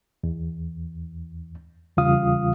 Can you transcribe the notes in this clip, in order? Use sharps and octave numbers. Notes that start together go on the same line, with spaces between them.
E2
E2 C#3 G3 F4 F5 D#6